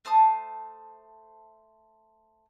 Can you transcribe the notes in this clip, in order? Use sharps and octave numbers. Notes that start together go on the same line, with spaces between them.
A3 C5 A5 D#6